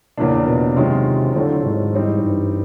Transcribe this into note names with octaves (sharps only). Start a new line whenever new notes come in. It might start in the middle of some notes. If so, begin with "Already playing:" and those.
E2 A#2 C#3 F3 A#3 D4
B2
F#2 C3 D#3 G#3 C#4 F4
A2 D3 F#3 A3 C4 F4
G#2
E3 G3 C4 D#4
G2